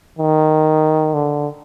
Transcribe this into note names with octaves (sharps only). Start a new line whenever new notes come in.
D#3
D3